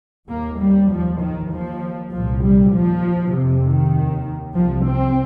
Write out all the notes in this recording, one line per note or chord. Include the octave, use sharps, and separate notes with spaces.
D#2 A#3
G3
D#2 F3
D#3
D#2 F3
C2 A#2 F3
G3
D#2 F3
F2 C3
D#3
D#2
C2 C3 F3
C4